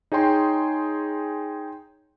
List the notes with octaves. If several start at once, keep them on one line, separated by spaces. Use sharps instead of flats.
D#4 G#4 C#5 G5 C6